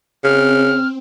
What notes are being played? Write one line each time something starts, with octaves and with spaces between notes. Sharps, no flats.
C#3 C4 F6